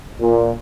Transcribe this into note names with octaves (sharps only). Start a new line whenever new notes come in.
A#2